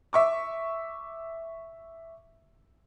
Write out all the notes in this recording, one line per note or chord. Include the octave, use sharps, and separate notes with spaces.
E5 C#6 D6